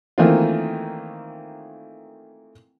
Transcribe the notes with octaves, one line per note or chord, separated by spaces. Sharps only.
D#3 E3 A3 A#3 C4 F4